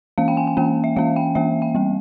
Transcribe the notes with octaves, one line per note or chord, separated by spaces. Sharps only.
E3 A#3 C#4 F5
G5
G#5
G#5
E3 A#3 C#4 G5
E5
E3 A#3 C#4 F5
G5
E3 A#3 C#4 E5
G5
G3 C4